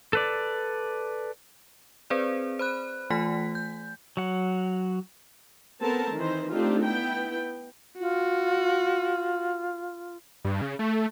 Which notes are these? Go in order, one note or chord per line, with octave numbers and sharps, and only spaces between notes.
A4 B4 D5
C4 G#4 B4 C5 D5
C5 B5 F#6
E3 A3 F4 G#5 B6
G6
F#3 F#5
B3 C4 A4 A#4 A5
D#3 E3 D#4 C5
A3 C4 D4 D#4 F4 G4
B3 E4 G5
F4 F#4
G2
C#3
A3